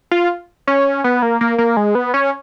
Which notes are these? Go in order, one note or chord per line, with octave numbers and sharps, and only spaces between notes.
F4
C#4
B3
A#3
A#3
A#3
G#3
B3
C#4